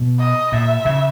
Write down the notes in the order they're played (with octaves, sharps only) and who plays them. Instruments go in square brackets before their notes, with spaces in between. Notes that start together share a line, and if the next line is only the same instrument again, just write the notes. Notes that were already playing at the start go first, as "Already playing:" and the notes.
Already playing: [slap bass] B2
[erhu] D#5
[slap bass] A#2 [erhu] E5
[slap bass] C#3